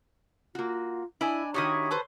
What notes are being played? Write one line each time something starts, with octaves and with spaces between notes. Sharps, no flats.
A#3 F4 F#4
D4 E4 D5 D#5 G#5
D#3 D#4 E4 F#4 G4 C#5 D#6
A4 B4 C5